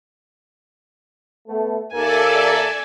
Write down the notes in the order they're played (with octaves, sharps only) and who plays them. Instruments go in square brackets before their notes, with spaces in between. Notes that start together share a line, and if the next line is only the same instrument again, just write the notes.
[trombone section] A3 B3
[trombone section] D#2 A#3 [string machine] A4 D5 E5 [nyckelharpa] G#5